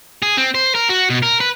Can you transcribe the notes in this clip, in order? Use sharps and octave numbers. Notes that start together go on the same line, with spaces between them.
G#4
C4
C5
A#4
F#4
B2
A#4
B4